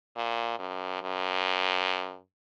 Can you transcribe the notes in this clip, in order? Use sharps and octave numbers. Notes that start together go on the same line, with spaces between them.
A#2
F#2
F#2